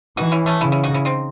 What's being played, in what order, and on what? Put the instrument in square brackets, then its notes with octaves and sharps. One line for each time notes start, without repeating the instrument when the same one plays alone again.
[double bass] E3 [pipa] D#4 F#4
[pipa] C#4 E4
A3 C#4
[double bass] C#3 [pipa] C#4 E4
[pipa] C#4 E4
D#4 F#4
C#4 E4
C4 D#4